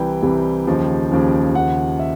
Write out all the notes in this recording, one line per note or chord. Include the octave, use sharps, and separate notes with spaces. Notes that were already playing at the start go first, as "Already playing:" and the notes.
Already playing: C2 C3 E3 G3 G5
C2 C3 E3 G3
D#2 C#3 F3
D#2 C#3 F3
D#2 C#3 F3 F#5
E5